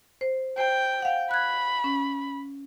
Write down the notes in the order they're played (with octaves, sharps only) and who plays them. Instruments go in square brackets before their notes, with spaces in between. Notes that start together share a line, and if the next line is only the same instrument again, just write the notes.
[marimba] C5
[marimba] C5 [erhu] G5
[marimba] F5 F#5
[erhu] B5 [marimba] F#6 G#6
[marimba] C#4